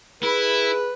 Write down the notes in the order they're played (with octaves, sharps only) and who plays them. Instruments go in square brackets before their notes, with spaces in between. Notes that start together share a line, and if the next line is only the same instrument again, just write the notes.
[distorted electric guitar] E4 [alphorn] G#4 [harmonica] B4